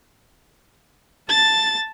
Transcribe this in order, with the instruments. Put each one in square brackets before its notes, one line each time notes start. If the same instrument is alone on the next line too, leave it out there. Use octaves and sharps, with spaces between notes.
[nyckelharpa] A5 [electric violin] A6